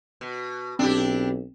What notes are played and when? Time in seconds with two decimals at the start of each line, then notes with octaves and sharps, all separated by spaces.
0.21 B2
0.79 B1 C4 D4 E4 G4